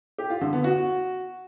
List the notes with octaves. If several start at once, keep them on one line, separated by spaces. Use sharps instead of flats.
G4
F4
D3
B3
F#4